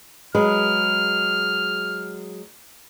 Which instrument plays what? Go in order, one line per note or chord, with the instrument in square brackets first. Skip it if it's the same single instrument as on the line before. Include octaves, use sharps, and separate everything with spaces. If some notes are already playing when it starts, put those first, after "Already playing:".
[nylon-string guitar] F#3 G#3 B4 [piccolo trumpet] F6